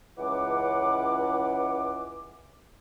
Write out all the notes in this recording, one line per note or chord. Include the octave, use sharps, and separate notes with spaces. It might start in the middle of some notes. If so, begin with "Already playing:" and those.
C#2 E3 F#5 D6